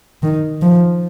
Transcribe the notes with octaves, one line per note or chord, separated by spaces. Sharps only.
D#3
F3